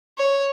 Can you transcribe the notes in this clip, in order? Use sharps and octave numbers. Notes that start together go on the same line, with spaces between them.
C#5